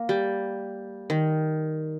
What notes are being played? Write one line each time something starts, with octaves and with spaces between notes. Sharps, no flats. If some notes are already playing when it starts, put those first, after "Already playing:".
Already playing: A#3
G3
D#3